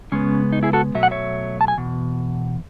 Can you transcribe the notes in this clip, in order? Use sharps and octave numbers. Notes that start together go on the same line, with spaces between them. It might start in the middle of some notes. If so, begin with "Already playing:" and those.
C#3 G#3 B3 C#4
D#4
E4 G#4
F#4 A4
B2 F#3 A3 E5
F#5
C#5 E5
A5
G#5
E2 B2